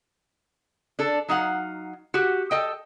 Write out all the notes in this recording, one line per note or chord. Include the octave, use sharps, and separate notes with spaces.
D4 A4
F#3 D#4 F5 F#5
F#4 G4
A4 D#5 G5